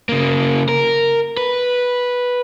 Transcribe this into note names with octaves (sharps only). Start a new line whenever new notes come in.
C#3 A#3
A#4
B4